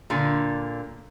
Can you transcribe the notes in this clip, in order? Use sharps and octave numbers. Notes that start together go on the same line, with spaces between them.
A#2 D3